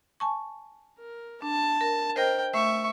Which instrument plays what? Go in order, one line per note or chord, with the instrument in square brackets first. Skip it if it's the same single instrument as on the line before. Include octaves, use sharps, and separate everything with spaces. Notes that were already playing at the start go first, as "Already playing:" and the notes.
[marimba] G#5 A5 C#6
[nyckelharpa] A#4
[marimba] D4 [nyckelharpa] A5
[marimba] A#4
[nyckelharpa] A#4 G5 [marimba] C5 D#5 A#6
[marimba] A3 [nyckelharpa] E5 C#6